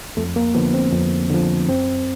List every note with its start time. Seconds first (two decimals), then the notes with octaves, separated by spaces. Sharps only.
0.17 F2 A3
0.36 A#3
0.55 D3 F3 B3
0.74 C4
0.93 F2
1.30 D3 F3
1.68 F#2 C4